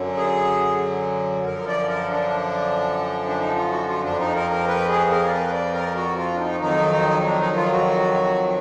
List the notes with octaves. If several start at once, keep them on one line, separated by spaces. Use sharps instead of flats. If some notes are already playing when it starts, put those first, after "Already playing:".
Already playing: F#2 D3 F#3
G#4
F#2 D3 F3 A#4
D5
A#4
D4
D4
D#4
F4
F#4
F4
F2 F3 D4
D#4
A#4
A#4
B4
G#4
A#4
D5
B4
D5
A#4
F#4
F4
D4
D#4
F2 D#3 F#3 D#4
D4
D#4
F4
F#4